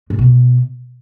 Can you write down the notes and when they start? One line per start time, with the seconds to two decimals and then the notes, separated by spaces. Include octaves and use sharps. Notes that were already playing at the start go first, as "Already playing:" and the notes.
0.10 A2
0.19 B2